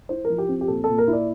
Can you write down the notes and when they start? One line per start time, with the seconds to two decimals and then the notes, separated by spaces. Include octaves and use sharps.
0.09 E4 C5
0.25 A#4
0.30 F3
0.38 G4
0.49 C4
0.61 G4
0.68 A#2 A4
0.84 A#2 A4
0.98 A#4
1.08 E4
1.13 D5